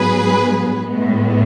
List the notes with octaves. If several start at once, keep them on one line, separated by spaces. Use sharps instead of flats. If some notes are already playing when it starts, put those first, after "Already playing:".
Already playing: G#2 F#3 B3 G#4 B4
A2 G#3 B3